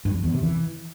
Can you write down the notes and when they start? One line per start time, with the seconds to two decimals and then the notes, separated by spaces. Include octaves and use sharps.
0.05 G2
0.15 F2
0.24 E2
0.33 C3
0.43 E3